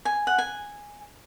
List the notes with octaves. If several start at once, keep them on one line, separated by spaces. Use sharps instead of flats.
G#5
F#5
G#5